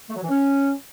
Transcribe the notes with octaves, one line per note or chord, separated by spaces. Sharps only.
A3
F#3
E3
C#4